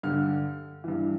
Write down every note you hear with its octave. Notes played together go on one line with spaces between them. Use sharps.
G2 D3 F6
G2 E3